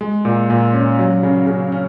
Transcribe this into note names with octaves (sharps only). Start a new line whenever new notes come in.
G#3
A#2
A#2
C#4
F#3
C#3
C#3
C#4